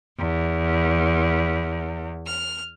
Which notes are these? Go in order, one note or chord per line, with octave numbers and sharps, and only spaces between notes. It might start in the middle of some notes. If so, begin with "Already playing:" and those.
E2
F6